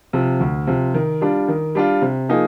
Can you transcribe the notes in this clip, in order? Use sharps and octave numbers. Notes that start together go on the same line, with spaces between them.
C3 F3
D2
C3 F3
D#3
G3 D4 F4
D#3
G3 D4 F4
C3
F3 A#3 D#4 G#4